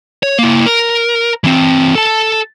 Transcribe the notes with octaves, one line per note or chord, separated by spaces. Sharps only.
C#5
A#3 E4
A#4
E3 C4
A4 A5